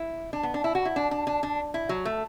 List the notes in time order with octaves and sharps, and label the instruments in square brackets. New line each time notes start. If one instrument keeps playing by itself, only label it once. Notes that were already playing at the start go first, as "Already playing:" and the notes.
Already playing: [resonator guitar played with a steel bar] E4
D4
B3
D4
E4
F#4
E4
D4
D4
D4
D4
E4
F#3
A3